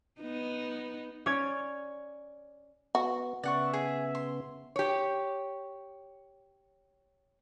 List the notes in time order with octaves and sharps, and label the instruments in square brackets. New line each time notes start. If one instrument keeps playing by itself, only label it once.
[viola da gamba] B3 D#4
[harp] C#4 C#5 D5 G#6
[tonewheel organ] B3 [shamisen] F#4
[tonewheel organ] C#3 B3 [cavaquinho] D5 F#5 C#6 [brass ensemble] E5
[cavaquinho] G#4
C6
[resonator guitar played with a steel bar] G4 C#5